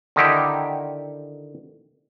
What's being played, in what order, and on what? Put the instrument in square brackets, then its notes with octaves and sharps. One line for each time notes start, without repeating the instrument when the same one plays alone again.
[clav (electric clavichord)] D3 D#3 D#4 E4 G4